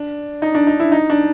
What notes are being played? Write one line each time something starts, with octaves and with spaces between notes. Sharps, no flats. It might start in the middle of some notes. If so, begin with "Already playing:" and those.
Already playing: D4
D#4
D4
D#4
E4
D#4
D4